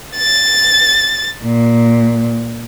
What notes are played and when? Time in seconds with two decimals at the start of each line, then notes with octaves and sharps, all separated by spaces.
0.17 A6
1.44 A#2